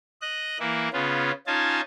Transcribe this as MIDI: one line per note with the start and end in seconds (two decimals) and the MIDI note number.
0.21 0.58 75
0.21 0.58 90
0.60 0.89 52
0.60 0.89 58
0.60 0.89 64
0.93 1.32 49
0.93 1.32 59
0.93 1.32 61
0.93 1.32 65
1.47 1.81 61
1.47 1.81 63
1.47 1.81 65
1.47 1.81 80
1.47 1.81 81